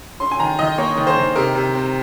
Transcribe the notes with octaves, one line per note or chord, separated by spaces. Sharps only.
C#4 C6
G#5
D#3 A#5
D#3 D#5
A#3 C#5
D#3
C5
D#3
C3 A#4
C3
C4